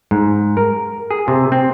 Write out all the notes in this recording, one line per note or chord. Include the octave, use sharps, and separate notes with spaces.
G#2
A#4
G#4
C3
C4